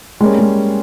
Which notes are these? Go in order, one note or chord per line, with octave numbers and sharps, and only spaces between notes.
G3 G#3 A#3 C#4
G#3